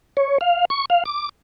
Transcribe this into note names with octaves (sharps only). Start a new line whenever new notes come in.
C#5
F5
C#6
F5
D6